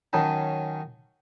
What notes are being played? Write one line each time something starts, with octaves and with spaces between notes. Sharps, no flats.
D#3 F#3 C#4 D#4 A5